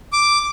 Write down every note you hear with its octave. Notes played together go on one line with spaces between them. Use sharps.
D6